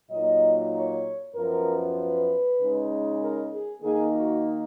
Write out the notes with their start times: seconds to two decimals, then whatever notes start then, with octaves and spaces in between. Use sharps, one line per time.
0.11 A#2 F#3 A#3 D#4 D#5
0.74 C#5
1.35 F#2 F3 B3 A#4
1.97 B4
2.60 C#3 G#3 D#4
3.21 A#4
3.52 G#4
3.83 D#3 A#3 D#4 G#4
4.14 F#4